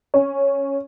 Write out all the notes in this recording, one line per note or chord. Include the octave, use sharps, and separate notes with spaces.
C#4